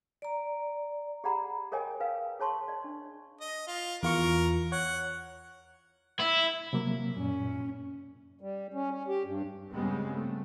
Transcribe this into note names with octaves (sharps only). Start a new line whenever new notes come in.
D5 A#5
G4 G#4 D5 F#5 A#5 B5
G#4 A#4 C#5 D#5 G5 G#5
A#4 B4 F5
G#4 C#5 A5 C6 C#6
D5 D#5
D4
D#5
F4
E2 F4 A#4 C#6
C#5 F#5
E4
C3 F#3 A#3
F#2 A#2 C#4
G3
C#4
C#4
G4
G2
G2 C#3 G3 G#3 B3 C4
A3